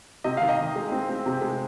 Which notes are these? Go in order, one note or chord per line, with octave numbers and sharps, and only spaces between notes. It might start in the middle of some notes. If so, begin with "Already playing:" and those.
C3 D#5
D#3 F5
D#5
D#3
G#3
C4
C4
C3
G#3